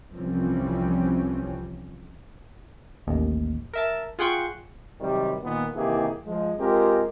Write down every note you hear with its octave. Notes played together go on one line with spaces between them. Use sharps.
C2 E3 F3 G3 C4 C#4
A1 D#2
A#4 E5 A5
F4 G#4 F#5 G5 C6 C#6
C3 D#3 F#3 G3
A#2 D#3 B3
C3 D#3 E3 A#3 G4 G#4
F3 G#3
G#3 C4 F4 G4 A#4